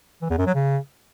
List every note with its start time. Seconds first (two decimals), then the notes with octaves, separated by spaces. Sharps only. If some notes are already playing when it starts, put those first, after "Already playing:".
0.22 E3
0.30 E2
0.38 F#2
0.46 F#3
0.54 C#3